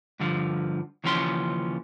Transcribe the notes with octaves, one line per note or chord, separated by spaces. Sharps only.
G2 D3 F3
D#2 C#3 E3 F3 C#4 C6